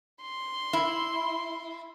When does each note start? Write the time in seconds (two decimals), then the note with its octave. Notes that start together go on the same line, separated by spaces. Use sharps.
0.23 C6
0.73 E4